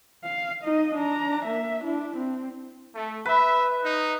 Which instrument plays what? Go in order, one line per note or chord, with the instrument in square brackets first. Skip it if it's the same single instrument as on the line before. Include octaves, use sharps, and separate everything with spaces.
[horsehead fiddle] F5
D#4 D#5
D4 A#5
A#3 E5
D4 E4
C4
[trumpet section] A3
[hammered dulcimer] B4 [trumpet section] E5
[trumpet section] D#4